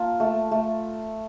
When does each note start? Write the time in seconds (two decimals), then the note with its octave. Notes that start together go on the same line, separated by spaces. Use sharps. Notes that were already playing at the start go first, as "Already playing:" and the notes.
Already playing: A#3 F4 A5
0.20 A3
0.51 A3